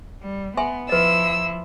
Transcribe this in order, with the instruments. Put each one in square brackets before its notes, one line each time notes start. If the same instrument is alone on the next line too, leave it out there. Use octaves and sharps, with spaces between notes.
[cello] G3
[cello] B3 [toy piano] E5 G#5 C6
[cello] F3 E4 [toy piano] B4 D#5 [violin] E6